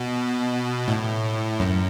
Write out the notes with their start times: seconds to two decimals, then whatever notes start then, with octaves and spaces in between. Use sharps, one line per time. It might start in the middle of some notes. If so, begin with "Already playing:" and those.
Already playing: B2
0.88 A2
1.60 F#2